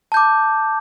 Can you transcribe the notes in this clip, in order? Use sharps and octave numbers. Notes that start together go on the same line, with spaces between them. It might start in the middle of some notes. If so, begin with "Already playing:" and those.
A5 D6 G6